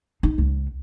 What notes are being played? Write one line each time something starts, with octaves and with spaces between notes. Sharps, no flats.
D#4
C#2